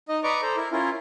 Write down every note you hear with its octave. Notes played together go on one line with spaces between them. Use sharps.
D#4 D#5
B4 D5 D#5 A#5 C#6 D6
A4 C5 A#5
E4 A#4
C#4 E4 F4 A#4